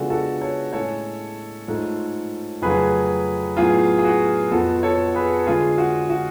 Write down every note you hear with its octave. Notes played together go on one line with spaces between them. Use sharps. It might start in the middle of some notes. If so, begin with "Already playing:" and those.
Already playing: C#3 F3 G#3 B3 D4 F#4 A4
F#4 A4
A4 C#5
A2 G#3 C#4 A4 C#5
G#2 F3 A3
F2 C#3 F#3 A3 G#4 B4
A2 F#3 B3 F4 G#4
G#4
F#4
F2 F3 B3 F#4 A4
A4 C#5
G#4 B4
D3 G#3 C#4 F4 G#4
F#4
F#4